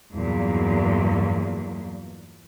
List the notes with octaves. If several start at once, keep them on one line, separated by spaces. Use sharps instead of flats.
E2 G2 A#2 F#3